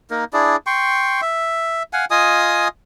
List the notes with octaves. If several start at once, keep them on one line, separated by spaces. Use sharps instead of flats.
A#3 D#4 A#4
D4 E4 G#4 D5
G5 C6 C#6
E5
F5 F#5 G#5
F4 D#5 G#5 D#6